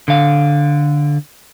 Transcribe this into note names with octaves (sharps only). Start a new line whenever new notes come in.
D3 F5